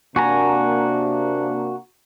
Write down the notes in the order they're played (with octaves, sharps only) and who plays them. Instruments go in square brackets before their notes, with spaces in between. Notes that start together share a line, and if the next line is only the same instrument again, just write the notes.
[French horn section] C3 A#3 D4 [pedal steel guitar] F#4 G#5 A#5